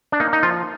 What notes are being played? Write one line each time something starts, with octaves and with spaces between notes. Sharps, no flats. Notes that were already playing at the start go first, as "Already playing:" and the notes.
D4
A#3 D#4
D#4
F3 F4